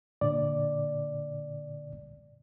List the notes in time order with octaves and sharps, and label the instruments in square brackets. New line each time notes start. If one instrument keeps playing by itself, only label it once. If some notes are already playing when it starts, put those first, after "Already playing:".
[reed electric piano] A#2 D3 D5